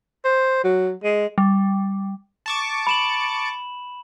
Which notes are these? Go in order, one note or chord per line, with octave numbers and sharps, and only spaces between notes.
C5
F#3
G#3
G3
A5 C#6 D6
B5 E7 F#7